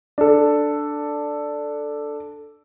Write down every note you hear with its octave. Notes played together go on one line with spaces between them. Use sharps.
D4 A4